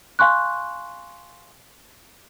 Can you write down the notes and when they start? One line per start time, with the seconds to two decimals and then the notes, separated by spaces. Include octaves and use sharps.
0.19 F5 G#5 C6 C#6 F#6